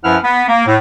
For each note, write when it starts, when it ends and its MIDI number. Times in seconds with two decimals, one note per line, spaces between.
0.04 0.17 42
0.04 0.17 53
0.04 0.17 64
0.04 0.17 71
0.04 0.17 78
0.04 0.17 89
0.23 0.44 59
0.47 0.65 58
0.66 0.76 45